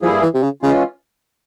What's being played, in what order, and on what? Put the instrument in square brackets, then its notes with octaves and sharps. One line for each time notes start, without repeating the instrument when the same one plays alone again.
[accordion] G2 G3 A#3 E4 G#4 [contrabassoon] F3
[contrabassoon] E3
C3
C#3
[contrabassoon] C#3 [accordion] E3 G#3 C#4 F4